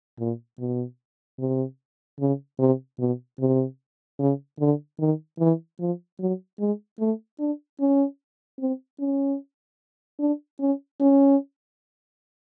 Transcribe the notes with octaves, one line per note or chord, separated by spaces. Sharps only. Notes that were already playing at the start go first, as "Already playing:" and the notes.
A#2
B2
C3
C#3
C3
B2
C3
C#3
D3
D#3
E3
F3
F#3
G#3
A3
D4
C#4
C4
C#4
D4
C#4
C#4